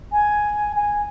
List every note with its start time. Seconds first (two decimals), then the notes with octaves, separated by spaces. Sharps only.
0.12 G#5
0.75 G#5